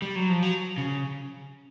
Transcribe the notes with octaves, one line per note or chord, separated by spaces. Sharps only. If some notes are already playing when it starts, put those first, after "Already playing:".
G3
F#3
F3
F#3
C#3